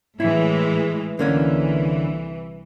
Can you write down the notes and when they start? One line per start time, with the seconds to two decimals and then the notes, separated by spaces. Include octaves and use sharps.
0.20 A2 E3 G#3 E4
1.19 C2 D3 E3 A#3 C#4